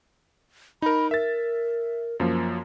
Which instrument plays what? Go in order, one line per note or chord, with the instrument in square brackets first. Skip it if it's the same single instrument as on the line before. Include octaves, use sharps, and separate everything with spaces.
[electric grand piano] D#4 A#4 [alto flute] B5
[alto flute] A#4 [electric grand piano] E5 A6
[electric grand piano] F#2 F3 A#3